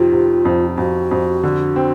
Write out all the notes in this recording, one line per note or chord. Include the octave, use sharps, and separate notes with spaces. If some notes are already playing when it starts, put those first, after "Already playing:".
Already playing: F2 C3 D#3 F4
C3
F2
F2 F#4
F2
D3
C4